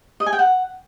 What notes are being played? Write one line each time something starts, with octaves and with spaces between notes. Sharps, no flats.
D#5
G#5
G5
F#5